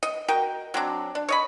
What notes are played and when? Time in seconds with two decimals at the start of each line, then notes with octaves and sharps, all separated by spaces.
0.03 D#5
0.28 F#4 A#4 D#5 G5
0.74 F#3 C4 D4
1.15 D4
1.28 C#5 D#5 B5